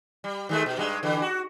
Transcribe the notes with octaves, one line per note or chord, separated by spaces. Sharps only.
G3
D#3 G#3 A3
B2
G2 G#3
D3 E3
F#4